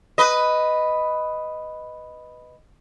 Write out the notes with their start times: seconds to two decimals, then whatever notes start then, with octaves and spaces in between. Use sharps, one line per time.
0.18 B4 D#5